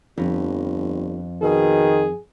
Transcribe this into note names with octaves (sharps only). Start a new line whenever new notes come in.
G1 F2
B2 D#3 G#4